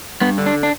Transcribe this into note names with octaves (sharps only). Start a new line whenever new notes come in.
G2 B3
D3
D4
D4